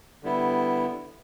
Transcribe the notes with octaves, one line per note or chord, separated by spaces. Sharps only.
D3 G3 B3 E4